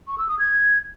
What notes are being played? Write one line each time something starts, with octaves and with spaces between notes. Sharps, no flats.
C#6
E6
D#6
G#6